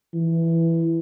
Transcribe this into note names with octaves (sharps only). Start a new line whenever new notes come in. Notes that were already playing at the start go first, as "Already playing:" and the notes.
E3